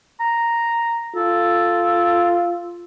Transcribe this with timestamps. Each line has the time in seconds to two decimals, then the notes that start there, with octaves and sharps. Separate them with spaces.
0.20 A#5
1.16 F4 A4